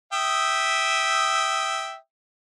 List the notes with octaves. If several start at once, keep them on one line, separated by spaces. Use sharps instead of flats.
E5 G5 D#6